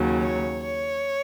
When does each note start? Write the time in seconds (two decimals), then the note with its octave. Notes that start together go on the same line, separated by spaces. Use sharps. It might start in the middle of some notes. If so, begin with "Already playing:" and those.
Already playing: D#2 C#3 F#3
0.22 C#5
0.64 C#5